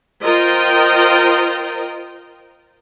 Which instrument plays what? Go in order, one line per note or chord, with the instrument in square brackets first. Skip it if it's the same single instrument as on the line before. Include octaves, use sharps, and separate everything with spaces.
[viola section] F4 A#4 C5 D#5 G5